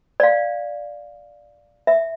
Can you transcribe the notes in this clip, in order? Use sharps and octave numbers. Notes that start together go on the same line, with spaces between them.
D5 F5
E5